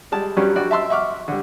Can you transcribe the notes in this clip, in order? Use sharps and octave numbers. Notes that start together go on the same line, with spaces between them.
G3 G#3 A5
G2 F#3 G3 C#4
G2 F#4 D5
E5 A5 C6 E6
E5 F#5 C#6 D6 F6
D3 G3